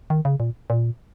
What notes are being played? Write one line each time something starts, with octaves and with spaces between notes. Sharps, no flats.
D#3
C#3
A#2
A#2